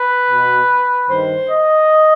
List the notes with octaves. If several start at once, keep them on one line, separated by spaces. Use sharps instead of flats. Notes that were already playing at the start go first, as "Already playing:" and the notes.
Already playing: B4
B2
G2 D#3 C5
D#5